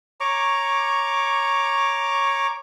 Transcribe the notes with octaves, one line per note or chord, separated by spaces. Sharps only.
C#5 A#5 C#6 D6